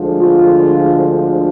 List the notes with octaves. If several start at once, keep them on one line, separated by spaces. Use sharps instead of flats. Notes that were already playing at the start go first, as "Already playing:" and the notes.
Already playing: D2 D3 F3 G#3
F4